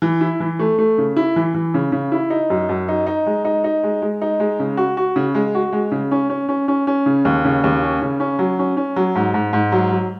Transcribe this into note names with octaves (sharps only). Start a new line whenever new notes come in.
E3
E4
E3
A3
A3
C#3
E4
E3
E3
C#3
C#3
E4
D#4
F#2
F#2
D#4
D#4
G#3
D#4
D#4
G#3
G#3
D#4
G#3
C#3
F#4
F#4
C#3
G#3
F#4
G#3
C#3
C#4
C#4
C#4
C#4
C#4
C#3
D#2
C#3
D#2
C#4
C#3
C#4
F#3
C#4
C#4
F#3
G#2
G#2
G#2
F#3
F#3